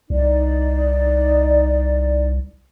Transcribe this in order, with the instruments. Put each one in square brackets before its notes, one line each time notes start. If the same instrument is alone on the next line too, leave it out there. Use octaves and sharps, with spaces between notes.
[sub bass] C2 [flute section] D#4 D5